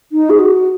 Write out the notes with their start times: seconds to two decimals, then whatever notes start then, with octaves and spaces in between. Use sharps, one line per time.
0.12 D#4
0.30 G#4
0.39 F#4